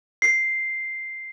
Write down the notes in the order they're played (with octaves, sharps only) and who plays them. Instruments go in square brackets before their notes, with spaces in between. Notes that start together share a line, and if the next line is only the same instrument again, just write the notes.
[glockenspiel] C7